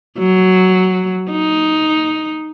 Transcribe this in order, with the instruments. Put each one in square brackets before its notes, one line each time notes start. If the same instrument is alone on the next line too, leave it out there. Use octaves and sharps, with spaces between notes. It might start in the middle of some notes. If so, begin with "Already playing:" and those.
[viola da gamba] F#3
D#4